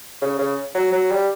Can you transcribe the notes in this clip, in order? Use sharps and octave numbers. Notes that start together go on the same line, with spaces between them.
C#3
C#3
F#3
F#3
G3